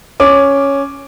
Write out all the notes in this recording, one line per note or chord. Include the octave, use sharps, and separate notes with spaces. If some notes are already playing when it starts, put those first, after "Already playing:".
C#4 D6